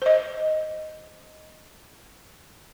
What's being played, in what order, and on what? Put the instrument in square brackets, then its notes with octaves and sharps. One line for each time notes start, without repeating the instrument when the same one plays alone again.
[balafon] C5 D#5